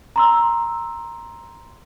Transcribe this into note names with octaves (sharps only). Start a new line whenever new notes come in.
A#5 C6 E6